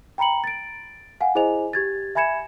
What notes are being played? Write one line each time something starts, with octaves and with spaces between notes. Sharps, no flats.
G5 A#5 B5 C#7 F#7
A6 D7
F5 F#5 G#5
E4 G#4 C5 D#5 G#5 F7
G4 G#6 A6
E5 G#5 B5 G#6 C#7 E7